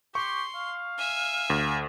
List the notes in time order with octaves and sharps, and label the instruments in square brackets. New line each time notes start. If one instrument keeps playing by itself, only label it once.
[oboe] G4 [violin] C6 [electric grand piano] C#6
[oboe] F5
[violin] E5 G#5
[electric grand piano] D2